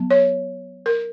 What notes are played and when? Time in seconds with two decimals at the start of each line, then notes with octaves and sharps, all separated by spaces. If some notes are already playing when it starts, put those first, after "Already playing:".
Already playing: F#3 B3
0.11 C#5
0.86 A#4